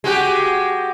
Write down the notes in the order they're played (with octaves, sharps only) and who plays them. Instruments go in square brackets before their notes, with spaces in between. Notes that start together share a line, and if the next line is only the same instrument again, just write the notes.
[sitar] G#3 F#4 G4